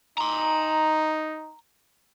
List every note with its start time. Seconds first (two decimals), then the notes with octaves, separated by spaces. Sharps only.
0.18 D#4 A#5 C6